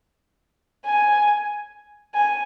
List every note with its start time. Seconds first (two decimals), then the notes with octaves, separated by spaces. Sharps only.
0.86 G#5
2.14 G#5